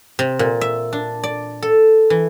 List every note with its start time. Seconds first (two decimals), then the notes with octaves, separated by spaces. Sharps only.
0.19 C3
0.39 A#2
0.61 E5
0.93 D4
1.24 D5
1.62 A4
2.10 E3